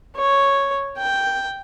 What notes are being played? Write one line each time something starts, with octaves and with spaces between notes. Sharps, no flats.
C#5
G5